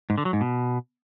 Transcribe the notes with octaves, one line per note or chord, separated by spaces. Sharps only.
G#2
D3
F#3
G#2
B2